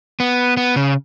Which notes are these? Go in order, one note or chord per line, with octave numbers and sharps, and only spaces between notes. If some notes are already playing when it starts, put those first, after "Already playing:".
B3
B3
C#3